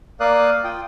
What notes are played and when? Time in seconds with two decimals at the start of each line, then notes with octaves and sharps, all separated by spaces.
0.20 A#3 A#4 D5 F5 D#6 F#6
0.64 F4 G5 D#6